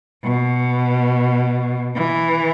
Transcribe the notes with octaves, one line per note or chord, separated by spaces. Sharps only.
B2
E3